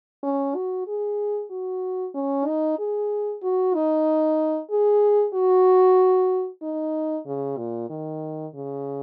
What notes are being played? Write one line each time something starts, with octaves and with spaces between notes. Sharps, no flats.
C#4
F#4
G#4
F#4
C#4
D#4
G#4
F#4
D#4
G#4
F#4
D#4
C#3
A#2
D#3
C#3